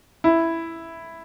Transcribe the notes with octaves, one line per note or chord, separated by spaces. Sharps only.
E4